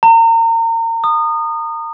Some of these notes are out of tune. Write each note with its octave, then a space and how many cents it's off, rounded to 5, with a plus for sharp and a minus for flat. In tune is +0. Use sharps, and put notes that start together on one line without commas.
A#5 -35
D#6 -25